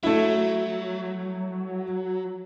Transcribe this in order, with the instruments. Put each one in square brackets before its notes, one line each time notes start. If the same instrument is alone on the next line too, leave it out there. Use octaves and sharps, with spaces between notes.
[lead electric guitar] F#3 [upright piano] A3 E4